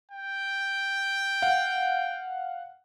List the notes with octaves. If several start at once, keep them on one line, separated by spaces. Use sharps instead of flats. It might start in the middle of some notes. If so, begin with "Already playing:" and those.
G5
F5 F#5